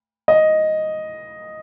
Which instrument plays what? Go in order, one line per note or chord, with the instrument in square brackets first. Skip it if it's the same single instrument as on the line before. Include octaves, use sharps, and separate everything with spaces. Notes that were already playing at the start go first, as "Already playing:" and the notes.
[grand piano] D#5